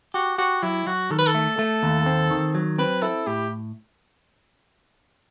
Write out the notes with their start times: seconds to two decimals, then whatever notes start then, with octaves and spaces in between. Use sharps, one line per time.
0.14 F#4 G4
0.38 F#4 G4
0.62 F#3 E4
0.87 F#3 F#4
1.11 D#3 A4
1.19 B4
1.27 A4
1.35 A3
1.59 A3
1.83 D#2
2.06 C4
2.31 D#3
2.55 F#3
2.78 C4 B4
3.02 E4 A4
3.27 A2 G4